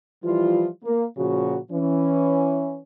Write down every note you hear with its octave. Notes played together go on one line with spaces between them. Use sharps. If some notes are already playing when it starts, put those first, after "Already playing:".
E3 F3 G3 E4 F4
A#3
A#2 C#3 F3 F#4
E3 C#4